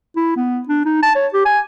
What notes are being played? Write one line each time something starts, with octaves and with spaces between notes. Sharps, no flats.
E4
B3
D4
D#4
A5
C#5
G4
G#5